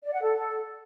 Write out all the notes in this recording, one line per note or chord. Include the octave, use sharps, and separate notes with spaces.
D5
F#5
A4